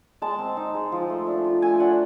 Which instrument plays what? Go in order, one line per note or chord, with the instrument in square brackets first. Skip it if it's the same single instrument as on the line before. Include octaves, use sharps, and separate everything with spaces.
[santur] G#3 A5
C4
D#4
G#3
F3
A3
D4
F4
A3 G#5
G5
D4 F#5